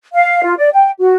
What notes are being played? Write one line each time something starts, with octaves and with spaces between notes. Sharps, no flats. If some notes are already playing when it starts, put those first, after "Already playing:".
F5
F4
D5
G5
F#4